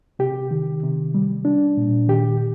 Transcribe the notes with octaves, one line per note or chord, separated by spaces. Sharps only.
C3 G4
D#3
C3
G3
D4
A#2
D#3 G4